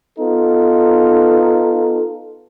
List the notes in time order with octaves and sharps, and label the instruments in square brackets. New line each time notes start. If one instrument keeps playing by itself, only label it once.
[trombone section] B3 D#4 F4 A4